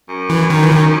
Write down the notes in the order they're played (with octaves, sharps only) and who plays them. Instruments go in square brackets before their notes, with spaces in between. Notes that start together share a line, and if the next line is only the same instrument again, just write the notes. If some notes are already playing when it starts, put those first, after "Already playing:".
[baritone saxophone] F#2
[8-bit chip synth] E3
D#3
E3
D#3